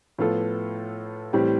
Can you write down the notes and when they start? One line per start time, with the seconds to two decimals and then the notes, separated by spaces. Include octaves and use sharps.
0.18 A2 F3 B3 F4 A4
1.33 A2 E3 G3 C4 G4